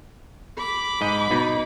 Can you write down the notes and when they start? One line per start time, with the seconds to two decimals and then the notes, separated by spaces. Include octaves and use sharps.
0.58 B5 D6
1.01 G#2 D#5
1.31 B2 D#4